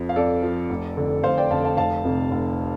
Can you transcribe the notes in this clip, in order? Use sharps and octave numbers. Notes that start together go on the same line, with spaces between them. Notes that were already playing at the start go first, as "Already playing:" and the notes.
Already playing: F2 F3
F5
F2 A4 D5
F3
F1
F2 D3
F1 C5 F5
D5 G5
F2 D3 F5 A5
F5 A5
F1 F5 A5
F2 C3
F1